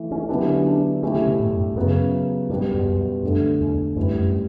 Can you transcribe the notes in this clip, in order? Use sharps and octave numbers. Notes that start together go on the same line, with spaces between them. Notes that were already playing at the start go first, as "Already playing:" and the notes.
Already playing: E3 A3 E4 A4
C#4
D3 F#3 B3 D4 E4 G4
C#4
D4
A3 C#4 E4 G4
D3
B2
A2
F#2
G2
F#2 C#3 F#3 B3
G2 B2 G3 B3
F#2
E2
F#2
F#2 D3 A3 D4 A4
E2
F#2 A2 G3 C#4 E4 B4
F#2